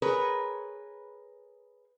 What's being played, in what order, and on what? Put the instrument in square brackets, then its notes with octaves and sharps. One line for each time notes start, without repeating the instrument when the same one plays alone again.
[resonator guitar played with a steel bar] G#4 A#4 B4 C#5